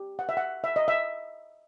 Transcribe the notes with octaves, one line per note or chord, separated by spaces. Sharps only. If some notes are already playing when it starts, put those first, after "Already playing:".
Already playing: G4
F#5
E5
F#5
E5
D#5
E5